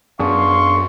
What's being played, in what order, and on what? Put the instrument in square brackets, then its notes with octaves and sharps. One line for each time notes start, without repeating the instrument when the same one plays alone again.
[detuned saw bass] F#2 [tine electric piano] B3 D4 G#4 [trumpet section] F5 C6 C#6